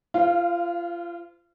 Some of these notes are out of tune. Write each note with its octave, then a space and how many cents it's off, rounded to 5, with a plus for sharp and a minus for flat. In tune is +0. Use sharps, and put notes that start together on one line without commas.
F4 -30 C5 -40 F5 +0